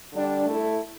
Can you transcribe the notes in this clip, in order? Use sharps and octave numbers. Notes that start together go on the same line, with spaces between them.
D3 G3 D4
A3 E4 A4